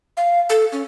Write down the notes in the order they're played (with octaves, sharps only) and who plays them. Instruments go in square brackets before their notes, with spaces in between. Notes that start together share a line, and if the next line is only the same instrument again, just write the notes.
[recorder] F5
A4
C#4